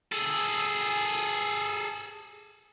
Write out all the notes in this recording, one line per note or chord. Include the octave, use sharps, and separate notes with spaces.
G#4 A4